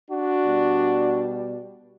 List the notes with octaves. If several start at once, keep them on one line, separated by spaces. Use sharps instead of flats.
D4 F#4
B2 G3